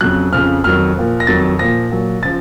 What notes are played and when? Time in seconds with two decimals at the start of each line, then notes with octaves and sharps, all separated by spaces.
0.01 F2 C#3 F#3 F#6
0.32 F2 C#3 F3 F6
0.64 F2 D#3 F#3 F6
0.95 A#2 F3
1.20 A#6
1.27 F2 D#3 F#3 A6
1.59 A#2 F3 A#6
1.91 A#2 F#3
2.23 C#3 F3 A6